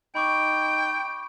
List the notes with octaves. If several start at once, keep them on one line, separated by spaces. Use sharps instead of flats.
D#4 G5 B5 C#6 D6 D7